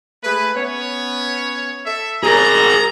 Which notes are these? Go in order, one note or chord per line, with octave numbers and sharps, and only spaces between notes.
A3 G#4 B4
B3 C#4 C#5
A4 E5
G#2 G#4 A#4 G#5 A#5